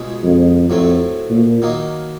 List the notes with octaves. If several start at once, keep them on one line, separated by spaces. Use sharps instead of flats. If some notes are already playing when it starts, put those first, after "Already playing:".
Already playing: C#2 B2 G#3
F2
F2 A2 F#3 A3 C4
A#2
D#3 F#3 A#3 D#4